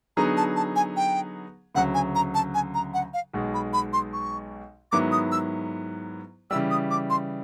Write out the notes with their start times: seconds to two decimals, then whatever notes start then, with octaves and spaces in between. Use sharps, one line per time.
0.17 D3 F#3 B3 D#4 G#4 A#5
0.37 A5
0.56 A5
0.76 G#5
0.96 G5
1.75 D2 C#3 F#3 F#5
1.94 G#5
2.15 A#5
2.34 A5
2.54 G#5
2.74 A#5
2.94 F#5
3.14 F5
3.34 B1 B2 G#3
3.54 B5
3.73 B5
3.93 C6
4.13 C#6
4.92 G#2 D#3 F#3 B3 E4 D6
5.12 D#6
5.32 E6
6.50 C#3 E3 G3 E6
6.71 D#6
6.90 D6
7.10 C6